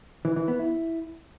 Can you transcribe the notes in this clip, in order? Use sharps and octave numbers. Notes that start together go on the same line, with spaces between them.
E3
E3
B3
E4